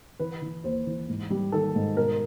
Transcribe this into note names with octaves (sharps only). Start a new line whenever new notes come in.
E3 B4
E3
D#2 C5
E3
G#2
G3
D#3 A4
G#2
B2 A#4